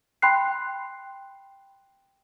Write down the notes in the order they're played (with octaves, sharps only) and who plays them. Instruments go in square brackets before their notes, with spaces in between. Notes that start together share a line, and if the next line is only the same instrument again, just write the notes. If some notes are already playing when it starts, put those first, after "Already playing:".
[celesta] G5 B5 C6 F#6 C7